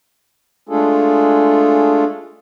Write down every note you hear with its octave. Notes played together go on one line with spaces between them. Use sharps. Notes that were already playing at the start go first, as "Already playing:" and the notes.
G#3 A3 D4 F4 G#4 A4